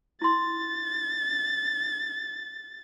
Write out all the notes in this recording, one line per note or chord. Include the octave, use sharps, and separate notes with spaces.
E4 C6 A6